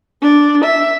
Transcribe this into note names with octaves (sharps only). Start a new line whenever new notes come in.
D4
E5